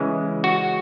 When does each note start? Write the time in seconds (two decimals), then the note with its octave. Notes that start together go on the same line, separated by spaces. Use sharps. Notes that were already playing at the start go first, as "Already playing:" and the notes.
Already playing: C#3 E3 G#3
0.44 F#4